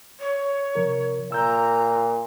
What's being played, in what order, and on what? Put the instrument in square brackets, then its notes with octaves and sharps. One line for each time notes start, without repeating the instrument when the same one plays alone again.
[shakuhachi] C#5
[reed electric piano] C3 F3 A#4
[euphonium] A#2 [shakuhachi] A#5 [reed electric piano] E6 G6